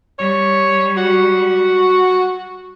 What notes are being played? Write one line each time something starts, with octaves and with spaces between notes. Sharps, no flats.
G3 C#5
F#4